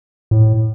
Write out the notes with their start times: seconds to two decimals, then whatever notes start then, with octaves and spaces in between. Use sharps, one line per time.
0.31 A2